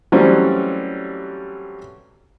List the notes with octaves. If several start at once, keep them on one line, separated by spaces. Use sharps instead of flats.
E3 F#3 G3 A3 C4 C#4